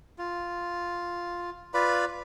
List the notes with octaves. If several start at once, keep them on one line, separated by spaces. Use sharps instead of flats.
F4
F4 B4 D5 B5